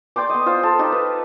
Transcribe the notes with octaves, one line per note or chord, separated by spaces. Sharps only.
D5 G5 C6 D6
B3 D#5
F4 C5
A4
D#4 G4
B4